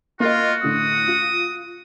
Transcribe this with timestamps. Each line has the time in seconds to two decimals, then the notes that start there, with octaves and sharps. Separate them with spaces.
0.20 A#3 F4 F#4 D#5
0.63 A2 D3 D#6
1.08 F4